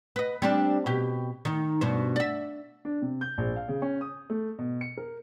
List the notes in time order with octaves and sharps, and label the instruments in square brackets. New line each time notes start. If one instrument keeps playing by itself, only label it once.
[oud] B4 D#5
G3 C4 D4
B2 G4
D#3 D#4
G2 B2 C5
D5 E5
[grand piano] D4
C3
G6
A#1
F5
C#3
C#4
D#6
A3
B2
C#7
A#4